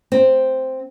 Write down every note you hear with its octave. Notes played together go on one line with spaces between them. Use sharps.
C4